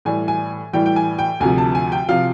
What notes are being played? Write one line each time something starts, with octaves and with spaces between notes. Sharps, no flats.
A2 E3 G3 G#5
G#5
A2 E3 G3 G5
G5
G#5
G5
D2 C3 F3 G#5
A5
G#5
G5
C3 F3 F5